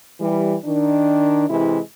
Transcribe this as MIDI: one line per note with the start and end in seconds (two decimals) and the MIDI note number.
0.20 0.54 52
0.20 0.54 55
0.65 1.48 51
0.65 1.48 62
1.50 1.79 48
1.50 1.79 52
1.50 1.79 56
1.50 1.79 64